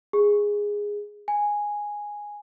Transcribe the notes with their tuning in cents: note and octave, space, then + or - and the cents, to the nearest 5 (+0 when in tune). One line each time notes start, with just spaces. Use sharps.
G#4 -10
G#5 -5